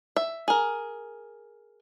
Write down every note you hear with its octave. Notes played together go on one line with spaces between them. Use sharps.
E5
G#4 A#4